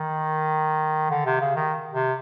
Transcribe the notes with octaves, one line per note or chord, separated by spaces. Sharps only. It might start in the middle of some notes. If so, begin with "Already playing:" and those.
Already playing: D#3
D3
C3
C#3
D#3
C3